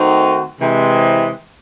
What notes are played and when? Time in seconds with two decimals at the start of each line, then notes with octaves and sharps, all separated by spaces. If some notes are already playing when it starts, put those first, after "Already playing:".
Already playing: D#3 A3 C4 D#4 F#4
0.61 C3 E3 G#3